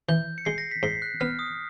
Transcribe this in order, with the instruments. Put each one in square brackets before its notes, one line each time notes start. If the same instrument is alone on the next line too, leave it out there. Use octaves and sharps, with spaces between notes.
[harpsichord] E3 [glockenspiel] G6
[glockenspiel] C#7
[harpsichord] G#3 [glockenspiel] C7
[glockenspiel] A#6
B6
[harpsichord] G#2 [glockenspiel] C7
[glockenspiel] F#6
[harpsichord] B3 [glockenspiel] F6
[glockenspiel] D#6